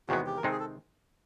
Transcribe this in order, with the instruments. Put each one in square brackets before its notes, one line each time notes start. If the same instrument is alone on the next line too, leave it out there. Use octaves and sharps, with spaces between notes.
[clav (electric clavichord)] E2 C3 D#3 G#3 B3 [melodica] F#4
[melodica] G4
A#4
[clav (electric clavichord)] C3 D#3 G#3 C4 D#4 [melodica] A4
[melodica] G#4
A4